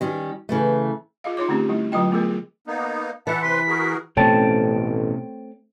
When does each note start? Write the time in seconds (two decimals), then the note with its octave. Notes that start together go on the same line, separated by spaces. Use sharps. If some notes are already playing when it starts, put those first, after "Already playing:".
0.01 D#3 G3 C#4
0.49 C#3 E3 A3
1.24 F4 G#4 D#5 F5
1.37 D#4 F4 C#5 D6
1.48 D3 A3 C4 C#4 G4
1.69 G3 A3 E4
1.92 D3 F#3 F4 D#5 G5
2.11 A3 B3 F4 G#4 A#4
2.67 A#3 B3 D#4
3.27 E3 E5 F#5 A5
3.42 C3 B4 C6 B6
3.68 F#4 G#4 A#4
4.17 A1 B2 A3 C4 C#4 C#5 G5 A5